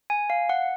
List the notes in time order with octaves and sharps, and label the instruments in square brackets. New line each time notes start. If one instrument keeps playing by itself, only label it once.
[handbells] G#5
F5
F#5